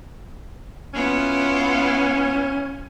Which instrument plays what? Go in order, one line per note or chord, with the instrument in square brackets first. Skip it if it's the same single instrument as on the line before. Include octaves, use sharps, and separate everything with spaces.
[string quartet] B3 E4 F4 [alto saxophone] C#4